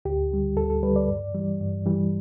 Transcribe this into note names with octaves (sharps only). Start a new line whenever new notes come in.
D2 G4
D3 G3
D2 A4
A4
D3 G3 B4
D5
G2
E3 G3
G2
E3 G3